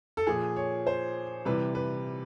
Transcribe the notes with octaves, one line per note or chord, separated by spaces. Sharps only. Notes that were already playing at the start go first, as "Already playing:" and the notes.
A4
A#2 F3 G#4
C#5
C5
C3 E3 G3 B4
B4